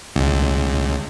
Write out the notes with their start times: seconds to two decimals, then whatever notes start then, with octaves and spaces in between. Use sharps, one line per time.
0.16 C#2